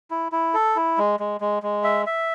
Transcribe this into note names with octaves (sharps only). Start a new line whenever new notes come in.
E4
E4
A4
E4
G#3
G#3
G#3
G#3
E5
E5